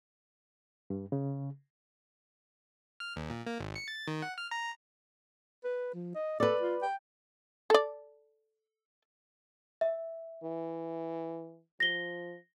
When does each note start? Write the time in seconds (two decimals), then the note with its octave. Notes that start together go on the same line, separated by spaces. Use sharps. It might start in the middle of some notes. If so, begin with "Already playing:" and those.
0.90 G2
1.12 C#3
3.00 F6
3.16 D#2
3.30 A#2
3.47 A#3
3.60 G#1
3.76 C#7
3.88 A6
4.08 D#3
4.22 F#5
4.38 F6
4.51 A#5
5.64 B4
5.94 F3
6.15 D#5
6.40 A4 B4 D5
6.61 F4
6.82 G5
7.70 A4 D5
9.81 E5
10.44 E3
11.80 F3 A#6 G7